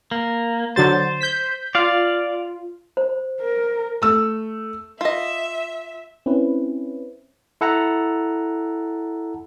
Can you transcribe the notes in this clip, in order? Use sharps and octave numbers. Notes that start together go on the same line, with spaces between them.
A#3
D3 F#3 C5 A6
G6 B6
F4 D5 F5
C5
A#4
A3 E6
F4 D#5 E5
C4 C#4 E4 B4
E4 A4 F#5 A5 A#5